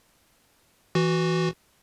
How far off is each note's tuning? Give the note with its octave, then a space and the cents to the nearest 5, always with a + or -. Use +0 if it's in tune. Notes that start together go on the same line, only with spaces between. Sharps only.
E3 +0 F#4 +0